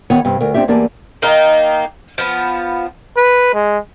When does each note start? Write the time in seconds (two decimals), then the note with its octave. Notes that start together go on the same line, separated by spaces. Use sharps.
0.10 D#2 D#3 B3 C#5 F#5
0.25 G2 C3 C4
0.40 D2 A#4
0.54 C4 D4 G4 E5
0.68 E2 A#3 G4 D5 G#5 A5
1.22 D#3 A#3 D#4
2.18 F3 B3
3.17 B4
3.54 G#3